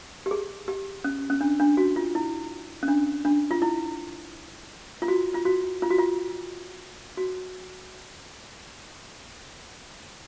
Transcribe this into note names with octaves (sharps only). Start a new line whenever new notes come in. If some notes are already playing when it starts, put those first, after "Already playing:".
G4
G#4
G4
C#4
C#4
D4
D4
F#4
F4
E4
C#4
D4
D4
F4
E4
F4
F#4
F4
F#4
F4
F#4
F4
F#4